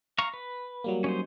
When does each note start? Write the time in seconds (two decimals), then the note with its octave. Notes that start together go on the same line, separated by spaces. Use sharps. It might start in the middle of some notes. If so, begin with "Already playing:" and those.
0.18 F5 A#5 C#6
0.34 B4
0.84 F#3 G3 A#3
1.04 C#4 D#4 C5